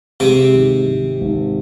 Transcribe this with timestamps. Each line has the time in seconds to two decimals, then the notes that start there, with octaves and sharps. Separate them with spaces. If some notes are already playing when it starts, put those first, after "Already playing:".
0.20 C3 G#3 C4
0.54 G#1
0.87 G#1
1.21 G#1